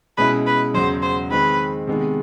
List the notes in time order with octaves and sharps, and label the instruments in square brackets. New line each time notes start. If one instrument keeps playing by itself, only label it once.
[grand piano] B2 G#3 C#4 E4 [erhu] B4
[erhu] B4
[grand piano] E2 C#3 F#3 [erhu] C5
[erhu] C5
[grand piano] D#3 G#3 C4 [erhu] B4
[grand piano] C3 D#3 G#3 B3